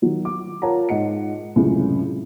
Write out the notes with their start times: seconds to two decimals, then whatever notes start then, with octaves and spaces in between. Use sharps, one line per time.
0.02 D#3 F#3
0.25 D6
0.62 F4 A#4 C#5 F#5 A5 A#5
0.89 G#2 D#5 F#5 C#7
1.56 C#2 F#2 A2 C3 G#3 C#4